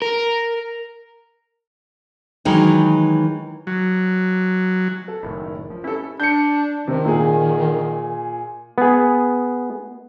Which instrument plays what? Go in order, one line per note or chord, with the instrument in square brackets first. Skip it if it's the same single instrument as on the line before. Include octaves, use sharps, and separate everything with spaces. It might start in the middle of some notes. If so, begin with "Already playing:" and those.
[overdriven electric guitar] A#4
[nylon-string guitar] D#3 E3 F#3 G#3 D#4
[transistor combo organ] F#3
[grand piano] A4
[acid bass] F#1 [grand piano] A2 D#3
[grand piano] F3
[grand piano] C#4 G4 A4 [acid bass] E4
[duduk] D4 [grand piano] G6 C#7
[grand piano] C3 [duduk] D#3
[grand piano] A#2 G#4
[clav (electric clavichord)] B3 G#4